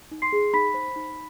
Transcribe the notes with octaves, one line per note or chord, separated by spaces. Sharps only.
D#4
C6 C7
G#4
D#4 B5 B6
C5
D#4